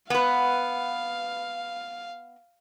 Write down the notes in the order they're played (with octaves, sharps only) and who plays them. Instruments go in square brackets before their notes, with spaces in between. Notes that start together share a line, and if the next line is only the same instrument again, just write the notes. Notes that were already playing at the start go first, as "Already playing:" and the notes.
[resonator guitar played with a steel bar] B3 B4 [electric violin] F5